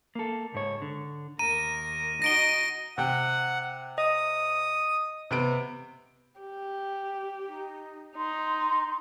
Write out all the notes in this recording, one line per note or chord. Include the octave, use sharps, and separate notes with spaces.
A#3 A4
C#2 G#2 C#5
D3
D#2 A#4 A#5 D#7
D#4 F#4 A#6 D7 G7
C3 F#5 G5
D#5 D#6
C3 B3 D7
G4
D#4
D#4 C6